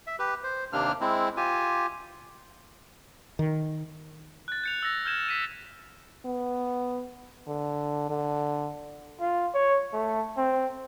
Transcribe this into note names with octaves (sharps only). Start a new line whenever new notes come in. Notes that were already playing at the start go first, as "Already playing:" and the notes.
E5
G4 B4
C5
D#2 C3 A#3 D4 F6
G#3 C4 E4
F4 G4 G#5
D#3
F#6 A6
G6 C#7 F7
E6 A6 A#6
F6 G6 G#6 E7
A6 B6 D#7
B3
D3
D3
F4
C#5
A3
C4